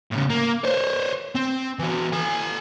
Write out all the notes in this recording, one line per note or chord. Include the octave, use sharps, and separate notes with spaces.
A2 C#3
A#3
C5 C#5
C4
E3 F#4
A4 G#5